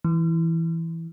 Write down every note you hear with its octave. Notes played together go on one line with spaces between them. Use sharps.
E3